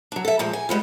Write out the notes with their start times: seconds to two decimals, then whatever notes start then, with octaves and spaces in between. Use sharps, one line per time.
0.12 F#3 D4
0.25 A4 E5
0.39 A#2 F3 G#3
0.53 G#5
0.69 G3 G#3 B3 F4